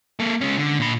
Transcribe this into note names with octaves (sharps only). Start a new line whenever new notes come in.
A#3 A4
G#3 C#4
D3
A#2 B5